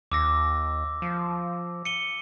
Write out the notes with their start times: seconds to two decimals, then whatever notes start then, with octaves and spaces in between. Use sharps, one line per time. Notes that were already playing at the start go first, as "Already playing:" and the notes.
0.12 D#2 D6 E6 A#6
1.02 F3
1.85 C#7 D#7 G7